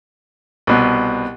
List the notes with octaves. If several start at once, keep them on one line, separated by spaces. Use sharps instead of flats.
C2 B2